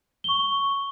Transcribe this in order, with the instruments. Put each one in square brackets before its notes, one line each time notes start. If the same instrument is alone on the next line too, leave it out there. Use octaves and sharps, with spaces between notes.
[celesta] C#6 G7